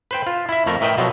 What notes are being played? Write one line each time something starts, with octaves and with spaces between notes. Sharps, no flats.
B4 C5 G5
F4
E4 E5
F2 A3 A#4
A2 A#4 B4 D#5 E5 G5
B2 F3 F#3